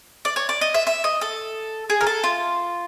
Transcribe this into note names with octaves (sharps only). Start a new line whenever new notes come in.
D5
C#5
D5
D#5
E5
E5
D#5
A4
G#4
A#4
A4
F4